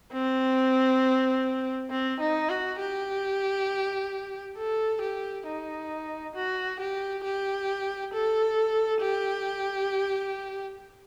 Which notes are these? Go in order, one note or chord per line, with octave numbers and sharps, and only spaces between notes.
C4
C4
D#4
F#4
G4
A4
G4
D#4
F#4
G4
G4
A4
G4